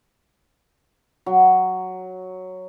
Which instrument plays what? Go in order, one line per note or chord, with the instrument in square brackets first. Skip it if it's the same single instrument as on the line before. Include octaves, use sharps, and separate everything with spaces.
[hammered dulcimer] F#3